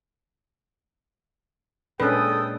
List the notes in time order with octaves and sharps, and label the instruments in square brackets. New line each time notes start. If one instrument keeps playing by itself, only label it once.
[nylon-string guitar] A#2 G#3 D4 [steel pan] C#4 B4 [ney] A4 [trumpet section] G5 D#6